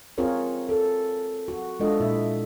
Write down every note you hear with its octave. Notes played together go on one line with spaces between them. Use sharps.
C4 F4 G#4 A#4 C#5
A4
F#4
G#3 D4 F4 A4 D#5
A#2 E4 E5